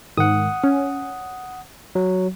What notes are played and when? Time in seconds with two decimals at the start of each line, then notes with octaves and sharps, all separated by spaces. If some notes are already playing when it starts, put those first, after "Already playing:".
0.17 G#2 D#3 F#5 D#6
0.64 C#4
1.95 F#3